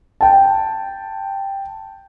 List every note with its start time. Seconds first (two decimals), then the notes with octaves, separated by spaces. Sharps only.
0.21 G5 A5